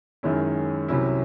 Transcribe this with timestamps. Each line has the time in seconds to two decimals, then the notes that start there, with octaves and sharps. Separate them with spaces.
0.23 F#2 D#3 G#3 C#4 E4
0.88 C2 C3 F#3 C#4 E4